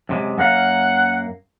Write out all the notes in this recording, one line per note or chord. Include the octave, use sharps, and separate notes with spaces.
F#2 C3 G#3
F#2 A#3 F5 F#5